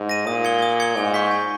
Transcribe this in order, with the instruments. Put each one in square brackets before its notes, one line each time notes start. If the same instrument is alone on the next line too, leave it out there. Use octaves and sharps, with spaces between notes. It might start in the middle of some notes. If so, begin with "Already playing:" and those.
Already playing: [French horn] G#2
[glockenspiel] A#6 D#7
[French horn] A#2 [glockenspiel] D#6
[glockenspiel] G#6 C#7 G7
D#6
G#6 C#7 G7
[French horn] G#2 [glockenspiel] G#5
[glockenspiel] C#6 G6 B6
G#5